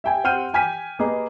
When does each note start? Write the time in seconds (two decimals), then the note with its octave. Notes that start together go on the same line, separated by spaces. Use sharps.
0.04 E5 G5 G#5
0.24 C4 F#5 G5 F6 G6 D#7
0.54 G5 G#5 F6 B6 D#7
0.99 A#3 G#4 B4 D#5